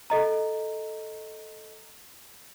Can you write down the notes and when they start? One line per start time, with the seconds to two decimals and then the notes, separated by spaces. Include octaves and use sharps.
0.10 A4 D#5 A#5